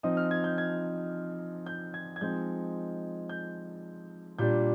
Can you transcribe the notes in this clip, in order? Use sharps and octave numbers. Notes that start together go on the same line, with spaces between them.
F3 C4 D#4 D#6
F6
G#6
G6
G#6
G6
G#6
G#6
F3 G#3 C4 D#4 G6
G6
A#2 G3 D4 G6